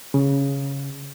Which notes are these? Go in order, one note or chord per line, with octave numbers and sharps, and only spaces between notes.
C#3